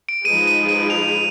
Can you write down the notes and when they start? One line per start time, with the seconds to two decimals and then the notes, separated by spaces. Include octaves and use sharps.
0.09 D7
0.25 F3 G#3 D#4 G#4 B4 D#7
0.47 D#7
0.69 D#7
0.90 F7